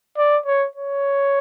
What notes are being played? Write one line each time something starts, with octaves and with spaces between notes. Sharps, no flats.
D5
C#5
C#5